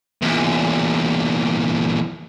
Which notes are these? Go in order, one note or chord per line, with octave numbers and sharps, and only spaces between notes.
E2 A#2